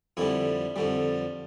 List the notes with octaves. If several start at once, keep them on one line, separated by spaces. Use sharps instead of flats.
F2 D3 G3 E4
F2 D3 G3